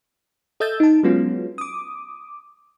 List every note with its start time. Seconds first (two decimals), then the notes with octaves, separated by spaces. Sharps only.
0.60 A4 D#5 E5 E6 G6 A6
0.80 D#4 A5
1.03 F#3 G#3 B3 C#4 F4
1.58 D6 D#6